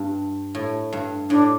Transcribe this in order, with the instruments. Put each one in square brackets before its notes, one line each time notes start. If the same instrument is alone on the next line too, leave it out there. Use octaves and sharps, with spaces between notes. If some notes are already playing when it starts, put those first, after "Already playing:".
Already playing: [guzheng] G2
A2
G2
[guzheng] A2 [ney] D4